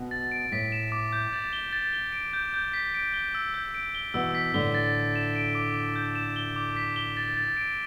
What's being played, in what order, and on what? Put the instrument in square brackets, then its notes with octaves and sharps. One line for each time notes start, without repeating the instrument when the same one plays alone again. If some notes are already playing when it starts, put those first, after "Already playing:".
Already playing: [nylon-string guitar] B2
[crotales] A6
D7
[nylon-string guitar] A2 [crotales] B6
[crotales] E7
D6
G6
A6
G7
A6
G7
D7
G6
G6
B6
D7
G7
E6
G6
D7
G7
[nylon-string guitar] B2 E3 [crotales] E6
[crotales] B6
[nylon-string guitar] A2 D3 [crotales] G7
[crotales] A6
A6
E7
D7
D6
D6
G6
E7
G7
D6
B6
G7
A6
A6
D7